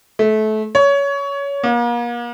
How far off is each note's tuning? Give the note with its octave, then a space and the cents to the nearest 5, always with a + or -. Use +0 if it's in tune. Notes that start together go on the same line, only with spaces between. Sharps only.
A3 -25
C#5 +20
A#3 +40